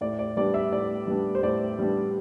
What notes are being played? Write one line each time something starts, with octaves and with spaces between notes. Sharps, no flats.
A2 D5
D5
G3 B3 D4 D5
E5
A2 D5
G3 B3 D4
C5
A2 D5
G3 B3 D4